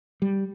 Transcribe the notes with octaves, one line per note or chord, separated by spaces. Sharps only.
G3